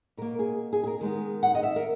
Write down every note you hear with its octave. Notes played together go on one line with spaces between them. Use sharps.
B2 A#3 A#4
G#4
G#4
G#4
A#4
D#3 G#3 B3
F#5
D#5
E5
A#4